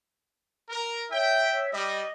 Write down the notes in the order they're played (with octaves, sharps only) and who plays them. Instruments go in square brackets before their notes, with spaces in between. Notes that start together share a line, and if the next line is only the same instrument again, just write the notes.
[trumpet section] A#4
[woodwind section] C#5 E5 [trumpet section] G5
[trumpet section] G3 [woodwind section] D#5